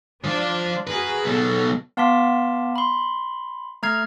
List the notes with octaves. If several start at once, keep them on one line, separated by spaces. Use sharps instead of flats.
F3 D4 C5
F#4 G#4 A#4 B4
B1 B2 A4
B3 F5 A5 C6 D6 B6
B5 C6
A3 A#5 F6 G#6 C7